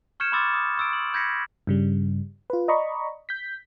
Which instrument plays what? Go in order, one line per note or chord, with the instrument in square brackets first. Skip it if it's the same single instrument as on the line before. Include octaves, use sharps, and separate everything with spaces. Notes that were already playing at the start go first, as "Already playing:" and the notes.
[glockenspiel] C#6 F6 G6 G#6 C#7 E7
B5 C6 D6 E6 A6
D#6
C#6 D6 E6 A6 D7
F#7
B5 G6 G#6 A#6 B6 C#7
[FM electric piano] G2 C#3 G3
F4 B4
D5 D#5 A#5 B5 C#6
G6 B6